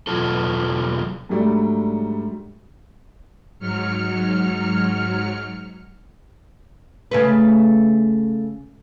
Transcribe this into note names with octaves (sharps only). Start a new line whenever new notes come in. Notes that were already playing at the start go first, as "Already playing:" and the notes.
E2 B2 F#3 F4 A4
G#2 F#3 G3 A3 D4
G#2 F#3 F6 C#7
C#3 A3 B4